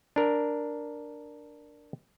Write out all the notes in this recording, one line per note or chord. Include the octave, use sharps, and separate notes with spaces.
D4 A#4